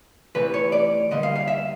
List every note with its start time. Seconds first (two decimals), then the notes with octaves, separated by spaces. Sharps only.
0.35 C3 E3 A3 B4
0.54 C#5
0.72 D5
1.11 D3 G3 A#3 D#5
1.23 F5
1.36 F5
1.48 E5